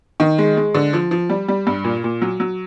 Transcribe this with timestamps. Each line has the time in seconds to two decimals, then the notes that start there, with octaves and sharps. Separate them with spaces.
0.20 D#3
0.38 G#3
0.57 G#3
0.75 D3
0.93 F3
1.11 F3
1.30 G3
1.48 G3
1.67 G2
1.84 A#2
2.04 A#2
2.22 F#3
2.40 F#3